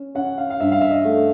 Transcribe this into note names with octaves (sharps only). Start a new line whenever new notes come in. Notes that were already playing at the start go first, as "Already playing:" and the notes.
Already playing: C#4
C#4 F#5
F5
F5
G2 E5
F5
E5
D#5
A3